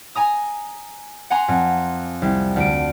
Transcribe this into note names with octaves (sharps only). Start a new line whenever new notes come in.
G#5 A#5 D#6
F#5 G#5 A#5 C6
F2
C2
D2 D7